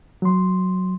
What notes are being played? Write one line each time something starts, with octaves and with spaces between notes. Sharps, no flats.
F#3 C6